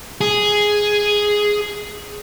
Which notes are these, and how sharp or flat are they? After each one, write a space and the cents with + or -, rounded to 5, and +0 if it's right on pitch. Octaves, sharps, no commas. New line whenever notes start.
G#4 +0